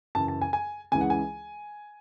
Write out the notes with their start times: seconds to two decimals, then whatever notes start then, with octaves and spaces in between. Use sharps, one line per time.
0.15 F#2 C#3 E3 A5
0.28 A5
0.42 G#5
0.53 G#5
0.92 C#2 C#3 E3 G#3 G#5
1.01 F#5
1.10 G#5